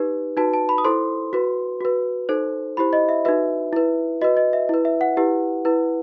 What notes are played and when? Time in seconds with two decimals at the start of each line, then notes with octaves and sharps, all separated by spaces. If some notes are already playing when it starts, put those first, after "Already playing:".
Already playing: D#4 G4 B4
0.37 D#4 F#4 B4 A5
0.54 A5
0.69 B5
0.78 D#6
0.84 E4 A4 C5 C6
1.33 F#4 B4
1.81 F#4 B4
2.29 D#4 A4 C5
2.77 E4 G4 C5 B5
2.93 D#5
3.09 E5
3.25 D#4 F#4 B4 E5
3.73 E4 B4
4.21 F#4 B4 D#5
4.37 D#5
4.53 E5
4.69 E4 B4
4.85 E5
5.01 F#5
5.17 E4 G4 B4
5.65 E4 B4